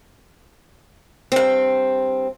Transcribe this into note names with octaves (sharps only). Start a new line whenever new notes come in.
G2 C4